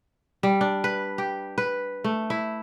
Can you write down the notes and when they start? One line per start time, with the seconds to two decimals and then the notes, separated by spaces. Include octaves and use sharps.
0.43 G3
0.61 D4
0.84 B4
1.18 G4
1.58 B4
2.04 A3
2.30 E4